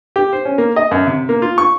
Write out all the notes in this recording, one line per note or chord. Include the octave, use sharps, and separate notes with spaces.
G4
C5
C#4
A#3
D#5
F#2
C3
A#3
F4
C#6